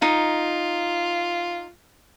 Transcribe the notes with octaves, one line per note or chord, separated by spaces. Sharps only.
D#4 F4